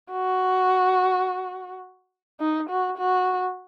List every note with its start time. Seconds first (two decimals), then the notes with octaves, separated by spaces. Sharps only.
0.12 F#4
2.40 D#4
2.69 F#4
2.98 F#4